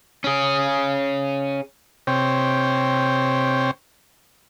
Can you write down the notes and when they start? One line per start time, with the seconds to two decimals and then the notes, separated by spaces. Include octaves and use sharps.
0.24 C#4 G#4
2.07 C3 C5 C#5 G5